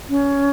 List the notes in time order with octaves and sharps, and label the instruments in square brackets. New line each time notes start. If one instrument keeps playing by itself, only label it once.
[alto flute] C#4